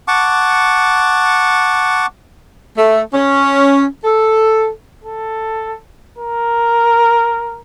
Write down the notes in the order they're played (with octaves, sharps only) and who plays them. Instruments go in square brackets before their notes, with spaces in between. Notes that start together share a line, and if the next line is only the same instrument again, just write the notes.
[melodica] F#5 A5 C#6 D6
[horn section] A3
C#4
A4
[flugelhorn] A4
A#4